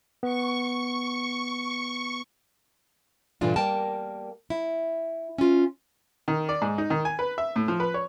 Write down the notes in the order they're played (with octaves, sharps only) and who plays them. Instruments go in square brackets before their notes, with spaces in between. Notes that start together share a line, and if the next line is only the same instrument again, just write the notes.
[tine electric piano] B3 [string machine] C#6
[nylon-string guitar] G2 A#2 D3 E3 D4 F4
G3 A#3 A#4 G5 A5
E4
C#4 F4
[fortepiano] D#3
D5
G#2
D#4
D#3
G#5
B4
E5
A2
F3
B4
C#5